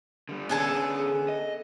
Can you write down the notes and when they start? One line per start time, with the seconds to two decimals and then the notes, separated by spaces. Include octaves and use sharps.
0.29 D3 G3
0.49 D3 B3 C#4 G#4 A4
1.28 D#5